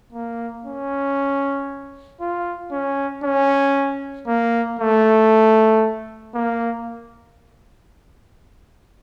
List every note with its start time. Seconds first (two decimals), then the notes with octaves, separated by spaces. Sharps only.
0.13 A#3
0.65 C#4
2.21 F4
2.71 C#4
3.24 C#4
4.27 A#3
4.79 A3
6.35 A#3